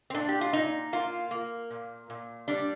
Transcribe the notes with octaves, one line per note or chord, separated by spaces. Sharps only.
C4
A#2 D4
G4
F4
A#2 D#4
A#3 F4
A#3
A#2
A#2
G3 D4